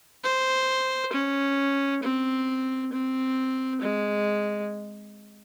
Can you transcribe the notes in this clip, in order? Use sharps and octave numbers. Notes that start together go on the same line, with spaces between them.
C5
C#4
C4
C4
G#3